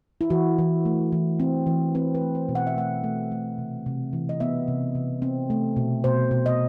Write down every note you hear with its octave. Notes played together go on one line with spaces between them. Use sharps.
E4
E3 F#4
E3
A3
E3
C4
E3
C4 B4
B4
A3
C5
B2
F#5
E5
A3 F#5
A3
A3
C3
C3
E3
D#5
B3 E5
C3
C3
C4
A3
B2
B2 C5
B2
D#5